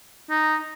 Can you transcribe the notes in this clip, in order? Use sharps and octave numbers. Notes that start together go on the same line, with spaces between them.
D#4